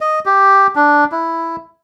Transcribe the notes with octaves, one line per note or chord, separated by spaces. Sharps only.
D#5
G4
D4
E4